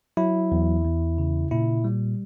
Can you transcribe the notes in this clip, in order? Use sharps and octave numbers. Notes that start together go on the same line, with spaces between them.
F#3 E4
E2
E2
C#3
A#2 E4
G3